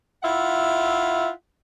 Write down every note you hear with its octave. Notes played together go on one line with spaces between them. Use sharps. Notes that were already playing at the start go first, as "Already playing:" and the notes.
E4 F4 E5 F#5